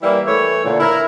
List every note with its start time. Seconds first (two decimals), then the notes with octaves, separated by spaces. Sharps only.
0.03 E3 G3 A#3 E4
0.28 E3 A3 C#5
0.65 A#2 D3
0.80 E4 A#4